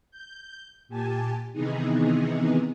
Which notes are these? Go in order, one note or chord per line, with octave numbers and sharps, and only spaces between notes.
G6
A#2 G4 G#5 A5
C3 D#3 E3 B3 D#4 G#4